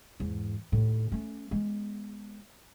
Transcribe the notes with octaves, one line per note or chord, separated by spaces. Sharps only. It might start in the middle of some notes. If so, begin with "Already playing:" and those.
E2 G#2
D#2 A2
A3 C#4
G#3 B3